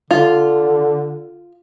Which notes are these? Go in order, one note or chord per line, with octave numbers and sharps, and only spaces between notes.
D3 F4